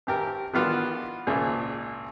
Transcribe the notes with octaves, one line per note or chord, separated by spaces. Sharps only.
G#1 G4 A#4
D#3 E3 B3 D4 F4 F#4
G#1 C#2 A#2 G#4